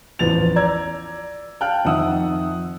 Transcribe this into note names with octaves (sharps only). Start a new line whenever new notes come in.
A1 E2 F3 B4 A6 F7
D5 A#5 E6 G#6
F5 G5 A5 F6 F#6
F2 D#3 E5 F#5 D#6 E6